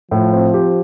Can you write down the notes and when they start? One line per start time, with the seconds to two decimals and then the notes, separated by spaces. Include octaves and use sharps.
0.11 A2 F3
0.32 C4
0.54 G4